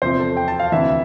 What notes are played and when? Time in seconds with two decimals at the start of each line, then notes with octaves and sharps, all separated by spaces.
0.02 E2 C3 F3 C5
0.19 A4
0.37 G5
0.48 A5
0.60 F5
0.72 D2 C3 E3 E5